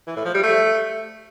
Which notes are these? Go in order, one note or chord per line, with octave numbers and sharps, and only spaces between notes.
E3
A2
F3
G3
A3